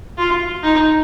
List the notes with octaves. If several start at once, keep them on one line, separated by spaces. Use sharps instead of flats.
F4
D#4